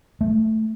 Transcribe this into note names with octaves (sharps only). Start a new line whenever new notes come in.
A3